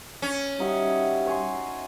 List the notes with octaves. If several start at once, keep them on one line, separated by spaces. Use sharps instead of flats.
C#4
G3 D#4 F#4 E5
C#5 G#5 C6